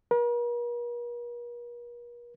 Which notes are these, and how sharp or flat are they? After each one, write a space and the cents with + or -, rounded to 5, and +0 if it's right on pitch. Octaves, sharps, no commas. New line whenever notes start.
A#4 +45